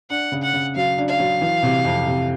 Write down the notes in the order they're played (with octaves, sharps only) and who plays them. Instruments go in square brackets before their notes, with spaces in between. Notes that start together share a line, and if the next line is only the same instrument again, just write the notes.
[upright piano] D4 [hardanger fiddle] F#5
[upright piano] C#3
[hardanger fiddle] F#5
[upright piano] C#3
[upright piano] F#3 [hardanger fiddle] F5
[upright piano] D4
[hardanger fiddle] F5
[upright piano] F#3
E3
C3
F2
C3